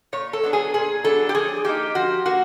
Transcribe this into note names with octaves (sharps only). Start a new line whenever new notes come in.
A#2 C#5
A4
F#3 B3 D4
G#4
A#2 G#4
F#3 B3 D4 A4
G4
F3 G#4
A#3 D#4 G4
F3 F#4
A#3 F#4